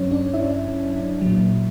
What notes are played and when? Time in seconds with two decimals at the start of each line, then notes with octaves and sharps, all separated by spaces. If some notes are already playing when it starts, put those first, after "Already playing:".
Already playing: G2 F#3 C#4 C#5
0.11 D4 D5
0.34 E4 E5
1.21 A#2 F#3